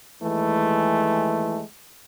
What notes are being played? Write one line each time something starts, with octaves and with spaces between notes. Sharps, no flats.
D#2 E3 G#3 A3